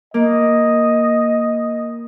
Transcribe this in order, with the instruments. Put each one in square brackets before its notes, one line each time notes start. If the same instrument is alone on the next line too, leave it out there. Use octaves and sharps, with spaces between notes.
[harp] A#3 [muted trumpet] D#5